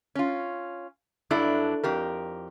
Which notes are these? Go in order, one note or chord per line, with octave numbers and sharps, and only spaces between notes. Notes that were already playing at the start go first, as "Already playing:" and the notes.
C#4 F4
G2 F#3 D4 E4 A4
F2 G4 A#4